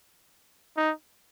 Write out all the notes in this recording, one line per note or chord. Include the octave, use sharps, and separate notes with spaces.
D#4